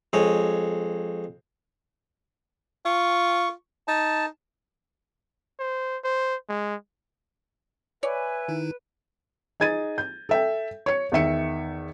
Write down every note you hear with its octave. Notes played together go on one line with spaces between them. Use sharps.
F2 G#3 C#5
F4 C#6
D#4 A5
C5
C5
G#3
B4 C#5 D5 E5 G#5
D#3 D#4 E4
D#4 G#4 G#6 A6 D#7
G6
A4 E5 G5
C#5 C#7
E2 D#3 E5 C#7